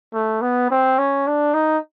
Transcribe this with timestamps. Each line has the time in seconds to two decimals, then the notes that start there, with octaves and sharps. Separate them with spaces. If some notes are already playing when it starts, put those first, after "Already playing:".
0.13 A3
0.42 B3
0.71 C4
0.99 C#4
1.27 D4
1.54 D#4